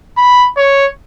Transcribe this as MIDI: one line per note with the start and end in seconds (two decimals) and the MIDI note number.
0.18 0.48 83
0.57 0.86 73